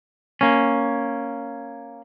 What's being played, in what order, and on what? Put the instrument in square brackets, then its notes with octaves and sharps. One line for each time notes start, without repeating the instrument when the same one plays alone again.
[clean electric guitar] A#3 C#4